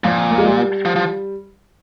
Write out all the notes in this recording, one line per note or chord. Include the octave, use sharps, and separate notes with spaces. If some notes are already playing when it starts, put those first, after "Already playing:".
A#2 F3
A#3
G#3
G3
F3
F3